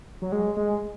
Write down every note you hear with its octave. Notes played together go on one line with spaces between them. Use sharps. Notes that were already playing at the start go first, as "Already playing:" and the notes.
F#3
G#3
G#3